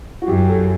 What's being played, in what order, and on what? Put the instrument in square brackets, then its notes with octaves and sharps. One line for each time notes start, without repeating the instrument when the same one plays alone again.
[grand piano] F#4
[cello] F#2 [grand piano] G4
[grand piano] A4